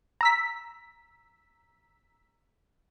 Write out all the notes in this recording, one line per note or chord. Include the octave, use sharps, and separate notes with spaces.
A#5 E6 B6